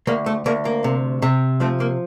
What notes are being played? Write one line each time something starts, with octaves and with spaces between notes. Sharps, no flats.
D2 A#3
A3
D2 A#3
A#3
C3
C3
F3 A3 C4
A#3